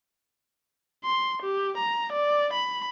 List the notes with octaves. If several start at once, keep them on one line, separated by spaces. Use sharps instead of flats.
C6
G4
A#5
D5
B5